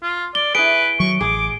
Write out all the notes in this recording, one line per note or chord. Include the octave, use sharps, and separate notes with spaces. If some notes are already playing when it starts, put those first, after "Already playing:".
F4
D5 G7
E4 G#4 B4 D7
D#3 F#3 C#6
A1 G#4 D6